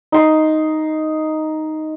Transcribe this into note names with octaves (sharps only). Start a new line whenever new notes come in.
D#4 C6